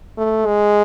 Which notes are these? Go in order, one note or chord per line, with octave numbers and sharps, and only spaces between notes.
A3
G#3